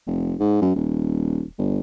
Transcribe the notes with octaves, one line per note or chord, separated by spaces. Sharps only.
F1
G#2
F#2
D#1
G1